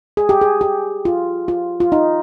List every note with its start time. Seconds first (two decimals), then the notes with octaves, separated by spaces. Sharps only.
0.17 G#4
0.29 G4
0.41 G#4
0.61 G4
1.05 F4
1.48 F4
1.80 F4
1.92 D#4